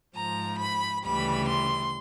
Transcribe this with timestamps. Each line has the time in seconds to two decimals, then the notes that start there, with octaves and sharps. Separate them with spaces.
0.17 G#2 F3 A#5
0.60 B5
1.05 D2 C#3 E3 G3 B5
1.50 C6